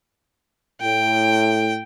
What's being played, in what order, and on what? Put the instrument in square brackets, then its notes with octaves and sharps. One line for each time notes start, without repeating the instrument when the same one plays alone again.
[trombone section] A2 [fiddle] G5